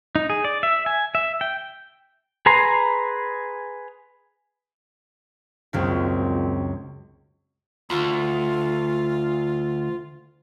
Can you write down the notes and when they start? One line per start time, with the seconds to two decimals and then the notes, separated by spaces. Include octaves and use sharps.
0.16 D#4
0.30 G#4
0.44 D5
0.63 E5
0.86 G#5
1.15 E5
1.41 G5
2.46 G#4 B4 A#5 C6
5.73 G#1 C#2 F#2 A#2 C#3 C4
7.90 D2 F4